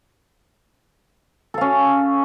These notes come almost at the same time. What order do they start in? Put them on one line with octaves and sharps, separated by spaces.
A4 F5 C#4